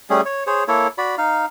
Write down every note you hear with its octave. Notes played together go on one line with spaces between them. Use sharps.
G3 A3 C#4 G#4
C#5
G#4 C5 C#5
A#3 E4 A4 C#5
F#4 D5 B5
D#4 F5